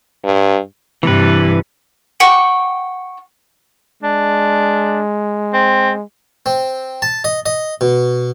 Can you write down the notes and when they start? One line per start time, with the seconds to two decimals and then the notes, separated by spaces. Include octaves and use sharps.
0.25 G2
1.03 G2 C3 E3 B4
2.20 F#5 G5 C#6 D6
4.03 G#3 D4
5.54 C4
6.46 C4
7.02 A5
7.24 D#5
7.46 D#5
7.81 B2